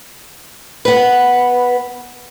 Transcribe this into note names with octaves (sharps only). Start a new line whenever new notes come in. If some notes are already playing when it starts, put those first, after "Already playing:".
B3 B4